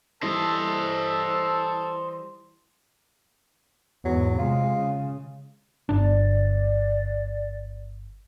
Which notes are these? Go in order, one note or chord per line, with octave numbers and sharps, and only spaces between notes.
E3 G3 E4 A4 C5 D#5
E2 G#2 F#3
C3 G#3 F4
C#3
G1 D4 D5